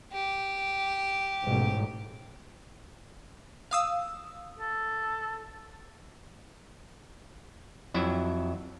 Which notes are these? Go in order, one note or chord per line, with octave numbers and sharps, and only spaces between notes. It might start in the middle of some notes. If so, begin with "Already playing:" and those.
G4
A1 G#2 B2
F5 D#6 E6
A4
F2 F#3 E4 E5